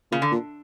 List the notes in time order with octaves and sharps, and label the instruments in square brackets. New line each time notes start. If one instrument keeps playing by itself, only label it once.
[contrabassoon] A#2 [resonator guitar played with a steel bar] C#3
[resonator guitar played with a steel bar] D3
[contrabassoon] A#2